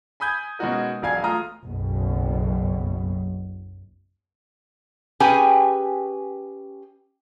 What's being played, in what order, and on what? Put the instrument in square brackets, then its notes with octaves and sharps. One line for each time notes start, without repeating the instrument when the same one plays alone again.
[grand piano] G#5 B5 D#6 G6 G#6
B2 G#3 C#4 D#4 F#4 A#4
E1 F#3 D5 F5 G#5 G#6
A3 F4 A#5 D#6 F6
[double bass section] F#1 B1 B2
[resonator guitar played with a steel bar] C#4 G4 G#4 B4 G5 G#5